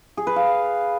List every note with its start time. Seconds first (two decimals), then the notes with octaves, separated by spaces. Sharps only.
0.17 G#4
0.27 B4
0.36 F5